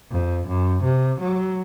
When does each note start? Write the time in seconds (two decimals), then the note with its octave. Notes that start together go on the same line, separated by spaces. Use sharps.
0.11 F2
0.48 F#2
0.84 C3
1.20 F#3